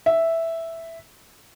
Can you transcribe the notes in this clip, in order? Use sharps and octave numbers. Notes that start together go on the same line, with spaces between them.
E5